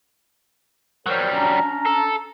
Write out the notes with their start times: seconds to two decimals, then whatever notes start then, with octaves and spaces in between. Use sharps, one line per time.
1.06 F#3 G3 A#4 C5 C#5
1.34 C#4 D4 A#5
1.86 A4